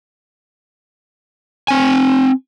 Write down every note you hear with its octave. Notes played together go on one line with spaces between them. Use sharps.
C4 G#5